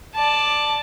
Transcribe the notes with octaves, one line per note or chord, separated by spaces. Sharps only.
D5 A5